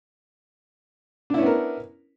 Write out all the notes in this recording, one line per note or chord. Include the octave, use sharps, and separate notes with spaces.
B3 C#4 D4 E4 A#4